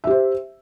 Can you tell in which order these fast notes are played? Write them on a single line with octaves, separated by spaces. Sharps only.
E5 G4 C5